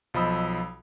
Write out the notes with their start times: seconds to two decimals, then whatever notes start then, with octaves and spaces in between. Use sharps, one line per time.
0.14 B1 F3 D#5 B5 D#6 E6